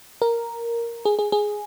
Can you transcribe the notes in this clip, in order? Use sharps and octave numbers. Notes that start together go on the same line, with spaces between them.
A#4
G#4
G#4
G#4